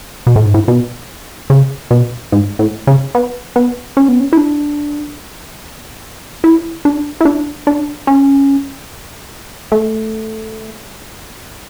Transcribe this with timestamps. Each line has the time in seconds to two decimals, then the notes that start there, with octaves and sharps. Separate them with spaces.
0.27 B2
0.36 A2
0.45 G#2
0.54 A2
0.68 B2
1.50 C#3
1.91 B2
2.32 G#2
2.59 A2
2.87 C#3
3.15 B3
3.56 B3
3.97 C#4
4.08 B3
4.20 C#4
4.33 E4
4.37 D4
6.44 E4
6.85 D4
7.21 E4
7.25 D4
7.67 D4
8.07 C#4
9.72 A3